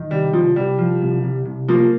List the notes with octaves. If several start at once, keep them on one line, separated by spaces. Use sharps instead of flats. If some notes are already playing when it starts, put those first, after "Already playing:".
Already playing: D#3
C2 G3
C2 F3
C2 G3
F3
C2
C2
C2
F3 A#3